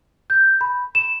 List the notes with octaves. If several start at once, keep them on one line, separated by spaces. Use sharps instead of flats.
G6
B5
E7